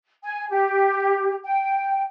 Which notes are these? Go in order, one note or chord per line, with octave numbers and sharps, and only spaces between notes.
G#5
G4
G5